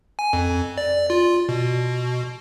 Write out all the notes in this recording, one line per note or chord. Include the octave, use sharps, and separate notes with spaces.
G#5
F2
D5
F4
B2